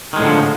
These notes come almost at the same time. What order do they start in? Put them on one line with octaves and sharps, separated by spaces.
D#3 G#3 A2 D3 F3